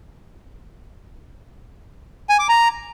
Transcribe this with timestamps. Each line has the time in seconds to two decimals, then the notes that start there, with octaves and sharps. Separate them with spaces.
2.29 G#5
2.39 D6
2.49 A#5